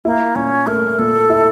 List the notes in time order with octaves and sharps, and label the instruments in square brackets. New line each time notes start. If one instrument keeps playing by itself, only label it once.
[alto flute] A#3 [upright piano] E4
[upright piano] A#2 [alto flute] C#4
[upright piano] A3 [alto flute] A#4
[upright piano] A#2 [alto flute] A4
[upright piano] E4